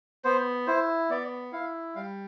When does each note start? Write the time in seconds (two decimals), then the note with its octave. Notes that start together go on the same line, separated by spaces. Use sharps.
0.24 B3 C5
0.67 E4 C5
1.10 B3 D5
1.52 E4 F5
1.95 G3 F5